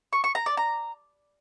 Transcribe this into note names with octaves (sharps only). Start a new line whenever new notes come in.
C#6
C#6
A#5
D5
A#5